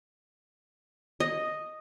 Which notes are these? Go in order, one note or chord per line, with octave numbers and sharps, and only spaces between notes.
D#5